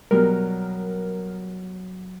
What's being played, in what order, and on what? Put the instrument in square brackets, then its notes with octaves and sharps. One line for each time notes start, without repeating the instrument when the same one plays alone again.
[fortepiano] B2 G3 [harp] F#3 [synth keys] A#4